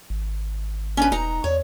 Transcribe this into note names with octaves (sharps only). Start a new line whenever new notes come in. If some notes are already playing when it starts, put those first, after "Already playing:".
G#1
C#4 D4 B4
E1 D#4 A#5
E2 C#5